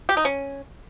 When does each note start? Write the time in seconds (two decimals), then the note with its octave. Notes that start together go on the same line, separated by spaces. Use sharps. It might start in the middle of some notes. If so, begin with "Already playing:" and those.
0.09 G4
0.17 D#4
0.25 C#4